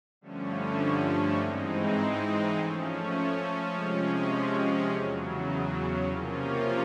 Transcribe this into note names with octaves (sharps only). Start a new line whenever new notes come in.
G2 D3 F3 A3 C#4
G#2 E3 G#3 C4 D#4
F3 A3 C#4
C3 F3 G#3 C#4
E2 C#3 F#3
C3 F3 A#3 C#4 F4